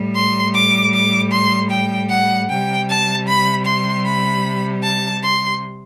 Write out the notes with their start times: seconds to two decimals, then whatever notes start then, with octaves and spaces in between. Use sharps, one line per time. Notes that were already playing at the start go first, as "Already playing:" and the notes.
Already playing: A2 G3
0.15 C6
0.55 D6
0.94 D6
1.32 C6
1.71 G5
2.10 F#5
2.49 C3 G3 G5
2.89 A5
3.28 B5
3.66 C6
4.05 B5
4.84 A5
5.23 C6